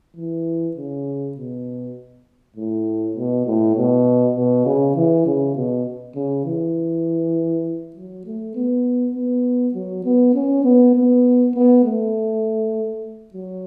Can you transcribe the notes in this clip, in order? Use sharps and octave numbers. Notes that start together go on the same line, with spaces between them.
E3
C#3
B2
A2
B2
A2
B2
B2
C#3
E3
C#3
B2
C#3
E3
F#3
A3
B3
B3
F#3
B3
C#4
B3
B3
B3
A3
F#3